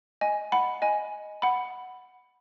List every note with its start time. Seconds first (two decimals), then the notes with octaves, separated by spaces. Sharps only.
0.21 D#5 G#5
0.52 F#5 B5
0.82 D#5 G#5
1.42 F#5 B5